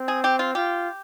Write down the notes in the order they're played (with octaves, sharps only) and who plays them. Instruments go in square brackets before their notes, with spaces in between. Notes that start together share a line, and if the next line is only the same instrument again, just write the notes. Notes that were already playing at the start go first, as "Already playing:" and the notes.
Already playing: [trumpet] C4
[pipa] G#4
G4
F4
[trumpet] F4 [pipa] G4